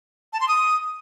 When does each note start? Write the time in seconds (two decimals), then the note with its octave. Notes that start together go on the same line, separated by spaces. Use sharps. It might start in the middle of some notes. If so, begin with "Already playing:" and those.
0.33 A5
0.41 C6
0.48 D#6